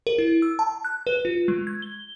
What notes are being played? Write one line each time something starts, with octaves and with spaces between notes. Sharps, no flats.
A#4
E4
E6
A5
F#6
B4
F4
G#3
G#6
G7